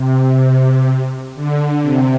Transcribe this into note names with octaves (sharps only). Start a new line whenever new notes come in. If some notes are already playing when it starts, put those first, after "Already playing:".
Already playing: C3
D3
C3